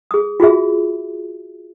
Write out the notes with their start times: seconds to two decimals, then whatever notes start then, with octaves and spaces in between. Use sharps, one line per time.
0.11 G#4 D#6
0.40 F4 F#4 G#4 E5